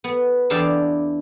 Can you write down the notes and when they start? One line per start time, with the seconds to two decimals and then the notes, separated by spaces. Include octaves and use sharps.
0.04 B3
0.50 E2 D4 E4 G4 F5 A5